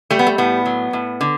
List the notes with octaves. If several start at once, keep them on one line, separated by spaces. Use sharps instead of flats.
G3 A3
B3
A3
A2 B3
F#3
A2
D3